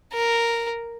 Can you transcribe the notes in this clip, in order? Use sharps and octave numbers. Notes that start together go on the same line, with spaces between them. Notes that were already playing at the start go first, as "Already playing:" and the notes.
A#4